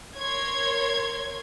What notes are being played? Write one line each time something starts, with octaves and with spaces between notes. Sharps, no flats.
A#4 C#5 C6 G#6